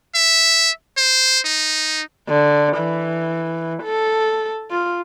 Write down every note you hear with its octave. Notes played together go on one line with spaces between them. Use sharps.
E5
C5
D#4
D3
E3
A4
F4